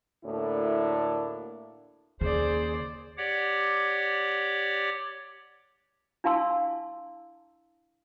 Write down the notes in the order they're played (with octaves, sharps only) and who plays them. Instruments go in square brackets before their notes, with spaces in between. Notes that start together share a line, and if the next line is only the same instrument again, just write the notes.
[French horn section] D2 A2 A#3 D4 E4
[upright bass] D#2 C#3 [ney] G#4 [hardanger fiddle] C5 D5
[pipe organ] G4 C#5 D5 F#5 D6
[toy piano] D4 E4 F5 A5 C6 E6